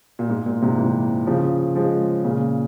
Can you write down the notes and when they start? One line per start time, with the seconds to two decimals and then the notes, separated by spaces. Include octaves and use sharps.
0.19 A#2
0.30 G#2
0.46 A#2
0.62 G#2 C3
0.78 C3 E3
1.27 C#3 F3
1.75 F3 G#3
2.24 A#2 C#3